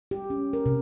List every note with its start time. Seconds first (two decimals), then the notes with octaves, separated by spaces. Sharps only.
0.11 G4
0.30 C#4
0.53 A#4
0.66 C3